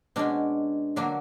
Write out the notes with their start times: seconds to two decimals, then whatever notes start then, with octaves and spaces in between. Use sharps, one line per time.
0.16 B2 G#3 C#4 D4
0.96 D3 F#3 A#3 D4